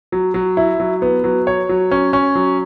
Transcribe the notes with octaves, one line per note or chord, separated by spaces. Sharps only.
F#3
F#3
E4
F#3
B3
F#3
C#5
F#3
C#4
C#4
F#3